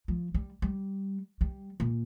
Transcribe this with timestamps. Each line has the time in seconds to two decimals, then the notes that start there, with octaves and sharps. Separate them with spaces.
0.08 F3
0.34 G3
0.62 G3
1.41 G3
1.80 A#2